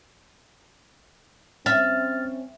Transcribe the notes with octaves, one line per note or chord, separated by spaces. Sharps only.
C4 C#4 E5 F6 A6